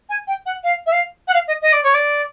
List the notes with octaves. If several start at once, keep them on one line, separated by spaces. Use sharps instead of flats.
G#5
G5
F#5
F5
E5
F5
F#5
F5
D#5
D#5
D5
C#5
D5